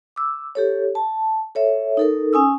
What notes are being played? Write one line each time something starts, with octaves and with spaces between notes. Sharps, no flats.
D6 E6
G4 A4 C#5
A5
A4 C#5 E5
D#4 A4 A#4
C#4 G#5 D#6 E6